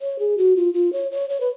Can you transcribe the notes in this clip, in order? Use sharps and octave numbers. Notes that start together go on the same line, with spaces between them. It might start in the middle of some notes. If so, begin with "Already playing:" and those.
C#5
G#4
F#4
F4
F4
C#5
C#5
C#5
B4